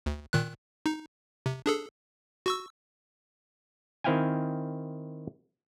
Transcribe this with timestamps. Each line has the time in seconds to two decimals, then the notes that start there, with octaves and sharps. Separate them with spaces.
0.06 D2
0.33 A#2 D#3 F#6
0.86 D#4
1.46 C3
1.66 D4 G#4 A4
2.46 F#4 C#6 E6
4.04 D#3 C4 E4 F5 G5 G#5